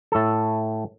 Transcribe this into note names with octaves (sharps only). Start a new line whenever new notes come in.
A2 A4